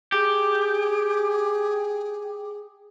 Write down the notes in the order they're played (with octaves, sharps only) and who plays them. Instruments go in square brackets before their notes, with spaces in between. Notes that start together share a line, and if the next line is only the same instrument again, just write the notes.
[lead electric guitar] G4 [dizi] G#4